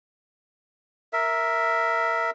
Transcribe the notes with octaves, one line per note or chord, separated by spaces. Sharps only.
A#4 E5